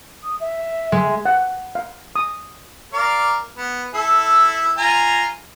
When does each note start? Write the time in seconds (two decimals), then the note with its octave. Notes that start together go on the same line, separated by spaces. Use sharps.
0.23 D#6
0.40 E5
0.92 G#3
1.26 F#5
1.75 F5
2.16 D#6
2.93 A#4 D5 F5
3.57 B3
3.94 E4 A4
4.78 F4 G#5 A#5